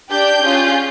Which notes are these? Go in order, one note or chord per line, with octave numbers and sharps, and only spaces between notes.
D4 G4 G6
C#4 F4 G#4